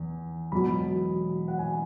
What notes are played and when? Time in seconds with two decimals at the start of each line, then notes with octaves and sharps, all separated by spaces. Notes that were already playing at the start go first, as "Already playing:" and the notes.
Already playing: E2
0.52 E1 E2 B2 F#3 B5
1.48 F#5
1.59 G#5